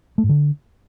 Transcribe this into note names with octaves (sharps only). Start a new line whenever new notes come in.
A3
G#2
D3